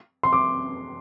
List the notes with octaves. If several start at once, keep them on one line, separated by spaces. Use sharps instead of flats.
C6
D6